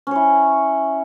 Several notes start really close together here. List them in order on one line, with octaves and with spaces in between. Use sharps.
C#4 C#5 E4